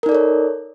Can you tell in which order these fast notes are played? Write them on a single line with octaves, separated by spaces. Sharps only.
A#4 D#4 D5 A4 C#5